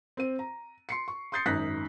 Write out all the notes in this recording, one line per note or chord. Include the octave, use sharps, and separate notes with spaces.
C4 C5 D#7
A#5
C6 C7 C#7
C#6
C6 D#6 G6 A6 C7 C#7
G#1 F#2 D#4 F#6 A#6 B6